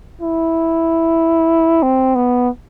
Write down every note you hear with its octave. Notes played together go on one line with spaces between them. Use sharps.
E4
C4
B3